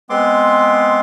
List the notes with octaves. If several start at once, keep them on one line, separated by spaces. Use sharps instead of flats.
G#3 B3 C4 C6 D6